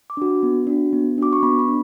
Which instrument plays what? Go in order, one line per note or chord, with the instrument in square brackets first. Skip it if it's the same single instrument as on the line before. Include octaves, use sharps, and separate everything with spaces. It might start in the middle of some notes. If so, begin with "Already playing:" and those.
[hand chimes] D6
D4 F#4
B3
D4 F#4
B3
D4 F#4 D6
C#6
B3 B5
B5
D4